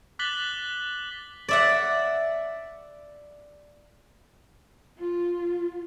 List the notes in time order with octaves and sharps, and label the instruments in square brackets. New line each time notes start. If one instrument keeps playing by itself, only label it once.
[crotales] D6 F#6 A6 B6 F#7 G7
[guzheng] D5 E5 F#5
[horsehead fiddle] F4